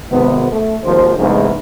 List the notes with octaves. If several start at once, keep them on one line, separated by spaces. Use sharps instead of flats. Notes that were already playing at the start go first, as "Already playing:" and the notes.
G#1 C3 B3
A3
G#1 D#2 F3 C5
E2 G#2 C3 G#3 A3 D#4